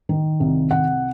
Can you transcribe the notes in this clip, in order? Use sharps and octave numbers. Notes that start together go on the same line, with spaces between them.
D#3
C2
C2 F#5